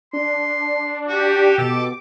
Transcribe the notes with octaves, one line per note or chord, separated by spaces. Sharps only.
D4 C6
F#4 G4
B2 A4 D6